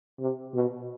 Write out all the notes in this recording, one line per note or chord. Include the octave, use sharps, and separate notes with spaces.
C3
B2